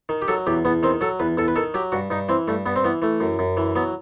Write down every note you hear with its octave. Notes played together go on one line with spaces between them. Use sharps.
D#3
G4
F#3 A4
E2 G4
E2 B3
D#3 C4
F#3 A4
E2 B4
E2 A4
B4
D#3 A4
F#3 G4
G2 F#4
G2 D#4
E3 C4
G2 A3
G2 B3
C4
E3 B3
E3 A3
F#2
F#2
E3
F#3 B3